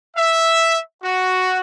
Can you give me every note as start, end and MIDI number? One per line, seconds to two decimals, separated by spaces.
0.17 0.79 76
1.04 1.60 66